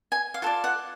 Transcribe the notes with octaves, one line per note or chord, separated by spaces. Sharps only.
G#5
F5
F4 A4 D5 F#5
F#5